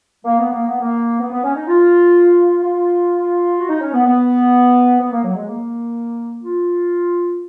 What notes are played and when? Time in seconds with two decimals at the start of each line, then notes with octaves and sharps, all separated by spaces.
0.25 A#3
0.39 B3
0.52 A#3
0.67 B3
0.81 A#3
1.20 B3
1.32 B3
1.44 C#4
1.56 D#4
1.67 F4
2.63 F4
3.58 F#4
3.69 D#4
3.81 C#4
3.94 B3
4.06 B3
5.00 B3
5.12 A#3
5.24 F#3
5.36 G#3
5.48 A#3
6.42 F4